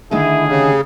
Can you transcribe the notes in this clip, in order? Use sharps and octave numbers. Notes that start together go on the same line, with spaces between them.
D3 D#3 A3 E4 G#4
C#3 C#4 G4